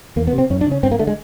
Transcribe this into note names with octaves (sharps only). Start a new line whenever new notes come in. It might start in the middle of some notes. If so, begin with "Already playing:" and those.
E2 A#3
B3
C3
C4
F#2 C#4
D4
C#3
C#4
G2 C4
A#3
D3 A3
G#3